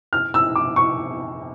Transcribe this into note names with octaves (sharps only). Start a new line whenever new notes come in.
F6
E6
D6
C#6